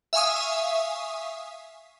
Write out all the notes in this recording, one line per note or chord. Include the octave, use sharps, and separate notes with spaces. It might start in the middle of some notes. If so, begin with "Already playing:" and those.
E5 F5 G#5 C#6 D#6